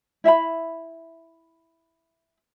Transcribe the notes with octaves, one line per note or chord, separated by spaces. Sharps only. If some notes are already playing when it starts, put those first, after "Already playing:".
E4 E5 F5 B5